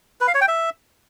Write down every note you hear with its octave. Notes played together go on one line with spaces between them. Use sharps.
B4
F5
C#5
G5
E5